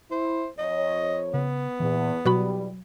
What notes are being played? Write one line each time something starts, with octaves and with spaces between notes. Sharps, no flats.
E4 C5
F2 C#5 D#5
C#3 B3
E2 A#2 E3
E2 B2 F#3 G3 F#4 B5